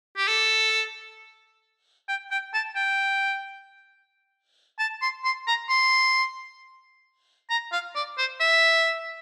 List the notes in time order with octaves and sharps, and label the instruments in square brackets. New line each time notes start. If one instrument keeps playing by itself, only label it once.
[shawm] G4
A4
G5
G5
A5
G5
A5
C6
C6
A#5
C6
A#5
F5
D5
C5
E5